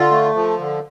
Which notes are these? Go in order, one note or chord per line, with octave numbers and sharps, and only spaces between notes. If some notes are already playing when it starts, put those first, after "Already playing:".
Already playing: D3 F4
A3
F3
D3